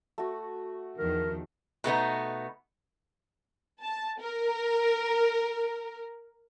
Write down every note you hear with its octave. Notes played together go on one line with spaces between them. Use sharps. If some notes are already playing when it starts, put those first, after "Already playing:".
A3 F#4
E2 D#3 F3 A#4
B2 A3 B3 D#4
A5
A#4